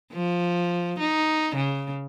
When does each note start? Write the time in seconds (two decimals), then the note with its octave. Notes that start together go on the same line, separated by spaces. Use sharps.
0.13 F3
0.99 D#4
1.55 C#3